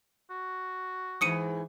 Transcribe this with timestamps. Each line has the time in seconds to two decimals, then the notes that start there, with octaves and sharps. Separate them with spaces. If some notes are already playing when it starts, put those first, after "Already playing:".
0.30 F#4
1.21 G#2 E3 D#6 C#7 D#7